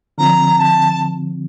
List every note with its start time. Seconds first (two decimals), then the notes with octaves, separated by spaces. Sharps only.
0.18 D3 F3 C4 A#5
0.59 A5